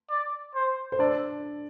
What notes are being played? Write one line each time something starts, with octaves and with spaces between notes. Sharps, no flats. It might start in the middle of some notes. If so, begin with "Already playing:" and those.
D5
C5
C5
D4 A4 D5